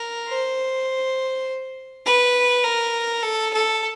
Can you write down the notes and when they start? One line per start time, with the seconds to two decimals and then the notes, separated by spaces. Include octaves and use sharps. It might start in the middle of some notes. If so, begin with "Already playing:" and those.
Already playing: A#4
0.29 C5
2.06 B4
2.65 A#4
3.23 A4
3.53 A4